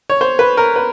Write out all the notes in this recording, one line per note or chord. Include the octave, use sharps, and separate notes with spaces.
C#5
C5
B4
A#4
B4